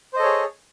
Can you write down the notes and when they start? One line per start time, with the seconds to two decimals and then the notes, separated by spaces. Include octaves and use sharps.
0.13 C5
0.16 D#5
0.19 A4
0.22 C#5
0.25 G#4